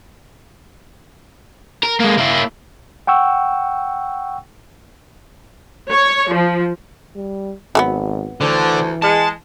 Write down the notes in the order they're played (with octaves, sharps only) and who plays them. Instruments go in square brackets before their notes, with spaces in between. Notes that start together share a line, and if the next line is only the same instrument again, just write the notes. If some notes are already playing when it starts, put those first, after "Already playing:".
[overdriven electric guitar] A#4
G#3 A#3
A#3 E4
[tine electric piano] F#5 G5 C#6 E6
[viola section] C#5
F3
[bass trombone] G3
[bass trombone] G#1 [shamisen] F#3 A3 B3
[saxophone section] D2 C5 [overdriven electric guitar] D3 [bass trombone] E3
[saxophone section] G#3 [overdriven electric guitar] A5